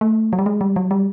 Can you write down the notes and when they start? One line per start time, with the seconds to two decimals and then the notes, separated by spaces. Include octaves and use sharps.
0.01 A3
0.33 F#3
0.39 G3
0.46 G#3
0.61 G3
0.76 F#3
0.91 G3